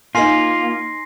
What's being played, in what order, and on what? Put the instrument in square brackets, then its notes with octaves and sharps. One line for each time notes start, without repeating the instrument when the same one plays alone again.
[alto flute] A#3 [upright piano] D#4 A#4 G#5 [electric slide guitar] F4 [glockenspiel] C6 A#6 C7